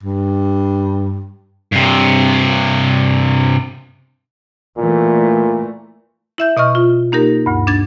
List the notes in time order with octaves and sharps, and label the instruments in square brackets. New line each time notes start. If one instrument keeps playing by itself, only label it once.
[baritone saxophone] G2
[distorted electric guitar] G2 C3
[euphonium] A#2 [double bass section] E3 A3
[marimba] E4 E5 G6
B2 D#5 C#6 F6
F4
A#3 D#4 G4 A#4
D2 G2
D4 G#6 A6